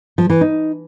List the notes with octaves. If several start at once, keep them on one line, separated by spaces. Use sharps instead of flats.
F3
E3
D#4